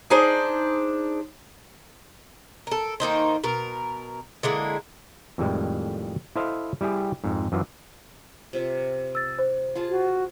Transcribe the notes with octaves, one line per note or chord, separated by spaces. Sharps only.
D4 D#4 G#4 C5
A4 A#4
D#3 A#3 D#4 C5
B2 A#4
D3 G#3 A#3 E4
F2 A2 D#3 G3 G#3
E4 A4 C5 D#5 F5
G3 E4 G4 G#4
F2 G#2
F#2 E3 F4
C3 F4 E5
E6 A6
C5
F4 G#4 A5
F#4